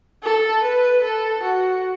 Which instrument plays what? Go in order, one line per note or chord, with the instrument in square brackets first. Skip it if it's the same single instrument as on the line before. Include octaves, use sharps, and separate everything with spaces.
[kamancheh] A4
B4
A4
F#4